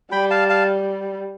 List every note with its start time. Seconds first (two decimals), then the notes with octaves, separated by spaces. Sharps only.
0.12 G3 G5 B5
0.31 F5 A5
0.49 F5 A5